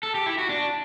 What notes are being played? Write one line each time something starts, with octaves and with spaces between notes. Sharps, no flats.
A4
G4
E4
F#4
D4